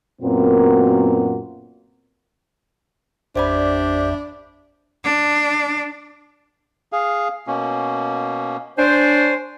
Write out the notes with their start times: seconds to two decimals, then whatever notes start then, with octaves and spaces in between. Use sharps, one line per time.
0.22 F#2 A#2 B3 C4 F#4 A#4
3.36 A1 F2 D4 G4 C5 D5 E5 B5
5.04 D4
6.92 G#4 F5
7.47 B2 A#3 C#4
8.78 D4 C5 C#5 G#5